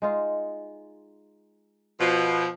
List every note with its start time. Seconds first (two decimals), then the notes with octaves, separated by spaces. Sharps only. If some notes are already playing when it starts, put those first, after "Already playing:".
0.02 G#3 D#4 F4
2.00 B2 F3